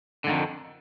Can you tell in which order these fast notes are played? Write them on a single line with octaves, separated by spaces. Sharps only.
D3 G#2 D#3 F2